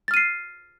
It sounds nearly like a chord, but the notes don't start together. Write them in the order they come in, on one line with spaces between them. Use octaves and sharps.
A6 F6 D#7 C7